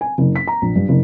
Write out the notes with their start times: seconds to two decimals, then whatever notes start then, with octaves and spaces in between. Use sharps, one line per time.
0.01 G#5
0.18 F#1
0.36 B6
0.47 A#5
0.62 A#1
0.76 G2
0.89 F#1